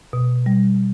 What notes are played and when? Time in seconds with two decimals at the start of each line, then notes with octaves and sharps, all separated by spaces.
0.13 B2
0.46 G3